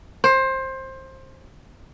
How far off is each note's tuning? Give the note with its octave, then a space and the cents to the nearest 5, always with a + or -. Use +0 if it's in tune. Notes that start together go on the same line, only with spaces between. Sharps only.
C5 +20